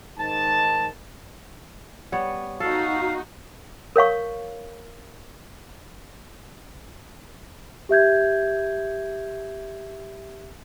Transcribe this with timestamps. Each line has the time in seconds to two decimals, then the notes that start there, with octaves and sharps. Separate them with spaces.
0.18 G#2 D#3 A5
2.12 G3 B3 C#5
2.60 D#4 F#4 A4 F5
3.96 A#4 C#5 F5 C#6
7.89 G4 E5 G6 G#6